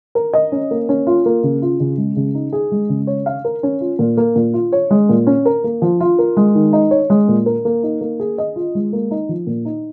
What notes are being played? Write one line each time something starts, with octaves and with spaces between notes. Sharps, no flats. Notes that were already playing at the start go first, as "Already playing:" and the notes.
A#4
D#5
C#4
A#3
C#4
F4
A#3
C#3
F4
C#3
G#3
C#3
D#4
G#4
G#3
C#3
C#5
F5
A#4
C#4
F4
A#2
A#3
A#2
F4
C#5
G#3
A#2
C#4
A#4
A#3
F3
F4
A#4
G#3
D#3
D#4
C#5
G#3
A#2
A#4
A#3
D#4
A#3
G#4
D#5
F4
G#3
A#3
D#4
F3
A#2
D#4